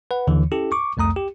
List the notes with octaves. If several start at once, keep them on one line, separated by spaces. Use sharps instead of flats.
B4 F#5
D#2 D3 E3
C#4 E4 G4 A4
C#6 D6
C2 F2 A3 A#5 D#6
G4